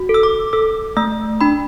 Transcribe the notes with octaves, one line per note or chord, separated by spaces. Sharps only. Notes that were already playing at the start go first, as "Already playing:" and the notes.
Already playing: F#4
A4
E6
D6
A4 E6
A3 E6
D4 B5